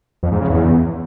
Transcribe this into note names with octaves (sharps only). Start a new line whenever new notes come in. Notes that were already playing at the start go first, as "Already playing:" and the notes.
F2
G#2
C#3
E2